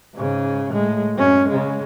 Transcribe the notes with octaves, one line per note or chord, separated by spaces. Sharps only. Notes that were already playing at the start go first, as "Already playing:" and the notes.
G#2 C#3
A2 G#3
F#2 C#4
C#3 G#3